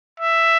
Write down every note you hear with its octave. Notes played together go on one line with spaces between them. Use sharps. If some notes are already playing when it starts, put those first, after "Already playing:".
E5